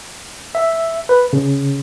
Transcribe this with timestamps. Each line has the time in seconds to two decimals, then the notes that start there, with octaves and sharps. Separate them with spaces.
0.55 E5
1.09 B4
1.33 C#3